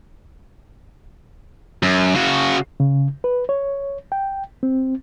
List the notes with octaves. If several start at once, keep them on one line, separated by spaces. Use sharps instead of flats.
F#2
C#3 F#4
C#3
B4
C#5
G5
C4